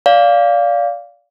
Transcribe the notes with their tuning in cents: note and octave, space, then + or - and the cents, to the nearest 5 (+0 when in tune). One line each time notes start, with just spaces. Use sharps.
D5 -25 F5 +0